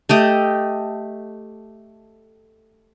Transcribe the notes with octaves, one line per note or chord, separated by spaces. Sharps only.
A3 G4 D#5